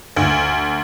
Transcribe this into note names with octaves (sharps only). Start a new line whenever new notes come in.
D2